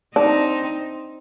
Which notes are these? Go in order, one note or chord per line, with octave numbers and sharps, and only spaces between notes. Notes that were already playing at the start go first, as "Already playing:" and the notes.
C4 D4 D#4